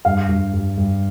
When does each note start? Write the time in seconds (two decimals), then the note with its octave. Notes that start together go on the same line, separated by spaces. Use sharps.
0.05 G2 F5
0.29 G2
0.53 G2
0.77 G2